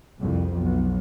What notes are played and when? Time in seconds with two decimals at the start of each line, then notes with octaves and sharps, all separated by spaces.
0.20 C2 F2
0.57 B1